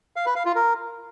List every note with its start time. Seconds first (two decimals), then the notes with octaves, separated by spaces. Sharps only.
0.16 F5
0.26 B4
0.36 F5
0.45 F4
0.55 A#4